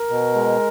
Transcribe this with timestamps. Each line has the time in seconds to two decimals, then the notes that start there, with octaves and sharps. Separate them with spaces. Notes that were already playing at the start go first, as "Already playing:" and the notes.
Already playing: A#4
0.09 B2
0.35 G#3